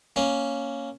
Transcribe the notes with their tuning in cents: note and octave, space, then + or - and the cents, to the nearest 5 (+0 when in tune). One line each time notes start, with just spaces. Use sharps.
A#3 +0 C#4 +0